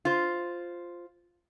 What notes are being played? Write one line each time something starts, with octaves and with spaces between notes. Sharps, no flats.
F4 C5